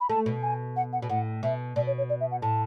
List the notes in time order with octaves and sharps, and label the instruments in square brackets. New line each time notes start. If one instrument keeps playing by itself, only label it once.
[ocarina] B5
[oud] A3 [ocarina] A5
[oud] B2
[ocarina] G#5
F#5
F#5
[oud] B2
[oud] A2 [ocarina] F#5
[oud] B2 [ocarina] E5
[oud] B2 [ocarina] D5
[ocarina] C#5
C#5
D5
E5
F#5
[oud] A2 [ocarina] A5